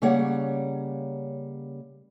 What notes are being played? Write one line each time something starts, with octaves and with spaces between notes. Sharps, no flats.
C#3 G3 A#3 C#5 F#5